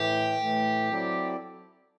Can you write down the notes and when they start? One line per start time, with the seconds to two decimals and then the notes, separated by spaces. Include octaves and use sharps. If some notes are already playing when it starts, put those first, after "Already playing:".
Already playing: A2 E3 A3 G4
0.39 A2 E3 A3
0.90 F#3 C4 E4 A4 D5